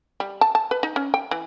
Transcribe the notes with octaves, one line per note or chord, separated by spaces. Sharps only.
G3
A5
A5
B4
D#4
C#4
G5
E3